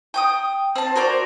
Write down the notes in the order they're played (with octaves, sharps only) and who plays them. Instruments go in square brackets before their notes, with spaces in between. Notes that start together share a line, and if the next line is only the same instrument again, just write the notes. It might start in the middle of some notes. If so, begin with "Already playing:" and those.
[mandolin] G5 C#6 D#6
C4 A5
F#4 A#4 C5 D5